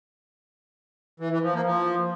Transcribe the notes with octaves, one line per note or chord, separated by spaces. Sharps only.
E3
E3
F3
A#3
F3